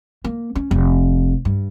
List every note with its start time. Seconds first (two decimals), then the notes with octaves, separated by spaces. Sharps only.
0.24 A#3
0.55 C#4
0.71 F1
1.45 G2